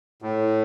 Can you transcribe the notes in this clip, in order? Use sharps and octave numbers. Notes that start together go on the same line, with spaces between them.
A2